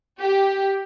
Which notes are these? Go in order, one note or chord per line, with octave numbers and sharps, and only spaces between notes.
G4